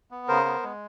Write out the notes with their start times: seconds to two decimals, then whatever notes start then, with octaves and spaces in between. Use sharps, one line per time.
0.11 B3
0.28 C#3 A#4 C5
0.45 B3
0.63 G#3